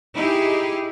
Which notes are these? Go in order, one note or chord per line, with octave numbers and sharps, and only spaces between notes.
D#4 E4 G4 G#4